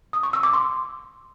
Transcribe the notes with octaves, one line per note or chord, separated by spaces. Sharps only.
D#6
C#6
E6
D6
C6